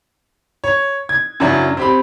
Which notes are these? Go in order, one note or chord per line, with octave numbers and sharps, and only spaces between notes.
C#5
G#6
F#2 C#3 F#3 D4 E4
C4 G4 B5